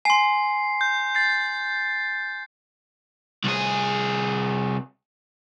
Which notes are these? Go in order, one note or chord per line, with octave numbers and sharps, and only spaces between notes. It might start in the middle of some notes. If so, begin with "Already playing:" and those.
G#5 C6 C7
G6
A6 C7
C2 G#4